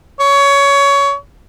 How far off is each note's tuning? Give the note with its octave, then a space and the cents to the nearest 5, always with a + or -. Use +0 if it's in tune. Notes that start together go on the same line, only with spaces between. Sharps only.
C#5 +20